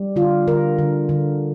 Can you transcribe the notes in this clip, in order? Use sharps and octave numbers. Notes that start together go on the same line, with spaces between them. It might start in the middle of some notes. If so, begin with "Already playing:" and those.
Already playing: G3
D3 F4
D3 A#4
D3
D3